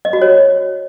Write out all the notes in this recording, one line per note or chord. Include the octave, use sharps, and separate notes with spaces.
D#5
F#4
C#5